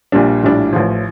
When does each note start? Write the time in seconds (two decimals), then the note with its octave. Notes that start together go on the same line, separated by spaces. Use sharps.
0.12 A#1 A#2 G3 D4
0.43 A#1 A2 G3 D4
0.73 A1 A2 F3